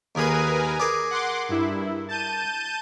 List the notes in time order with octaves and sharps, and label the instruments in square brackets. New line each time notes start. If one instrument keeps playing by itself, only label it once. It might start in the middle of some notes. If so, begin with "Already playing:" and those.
[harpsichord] D#2 G#4 D#6 [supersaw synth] A#4 B4 G#5
[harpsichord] G#4 A#4 D5
[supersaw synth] F#5 C6 D6
G2 E4
A5 G6 D#7